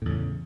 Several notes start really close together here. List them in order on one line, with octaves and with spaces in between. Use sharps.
A2 E2 C#3